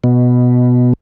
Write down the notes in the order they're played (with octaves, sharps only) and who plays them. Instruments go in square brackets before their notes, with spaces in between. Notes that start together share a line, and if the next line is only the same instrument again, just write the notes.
[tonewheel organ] B2